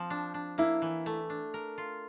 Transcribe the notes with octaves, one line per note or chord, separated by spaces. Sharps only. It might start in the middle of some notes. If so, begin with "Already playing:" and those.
Already playing: F3 C4
D4
D4
A#3 E4
E3
A3
D4
A#4
F4